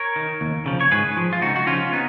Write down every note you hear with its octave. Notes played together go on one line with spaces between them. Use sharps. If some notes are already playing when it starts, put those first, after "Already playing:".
Already playing: A#4 C#5
D#3
D#2
C#3 F3
C#5
G#2 G#4 B4
F3
F4
C#2 D#4 F#4
F#4
C#3 F3 C#4 F4
B3 D#4